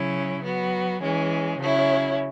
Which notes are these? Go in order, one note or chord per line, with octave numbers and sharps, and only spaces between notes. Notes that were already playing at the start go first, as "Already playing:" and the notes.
Already playing: C#3 F#3 C#4 E4
F#3 B3 F#4
E3 G#3 C#4
C#3 F#3 C#4 E4